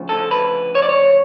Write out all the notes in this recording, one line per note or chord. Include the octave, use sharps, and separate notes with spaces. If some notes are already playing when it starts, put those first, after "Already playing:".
Already playing: D2 C#3 F3
A4
B4
C#5
D5
C#5